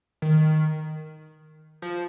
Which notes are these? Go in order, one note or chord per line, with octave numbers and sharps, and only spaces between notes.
D#3
F3